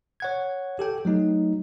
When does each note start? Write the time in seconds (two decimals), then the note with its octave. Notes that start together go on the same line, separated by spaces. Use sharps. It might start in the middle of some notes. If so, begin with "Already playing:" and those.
0.20 C#5 F#5 G#6
0.79 G4 A4 G5
1.05 F#3 A3 D#4